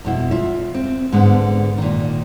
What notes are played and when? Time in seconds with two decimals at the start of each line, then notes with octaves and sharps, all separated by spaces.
0.05 F2 B2 E4
0.31 F4 E5
0.74 C4
1.12 G#2 D3 B3
1.78 A#2 D#3